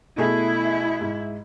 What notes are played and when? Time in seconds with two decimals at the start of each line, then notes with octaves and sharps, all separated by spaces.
0.17 B2 A3 E4 G#4
1.01 G#2